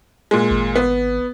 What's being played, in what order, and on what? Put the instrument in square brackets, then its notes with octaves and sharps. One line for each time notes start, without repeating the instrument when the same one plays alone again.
[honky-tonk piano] A#2 G#3
[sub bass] G#1
[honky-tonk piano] B3